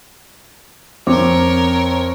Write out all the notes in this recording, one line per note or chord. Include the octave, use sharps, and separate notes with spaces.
F2 C4 A#4 C#5 D6